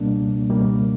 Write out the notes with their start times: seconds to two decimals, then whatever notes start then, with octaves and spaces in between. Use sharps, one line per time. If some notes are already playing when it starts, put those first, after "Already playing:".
Already playing: C#2 B2 G3 A#3 D4
0.50 C#2 B2 G3 A#3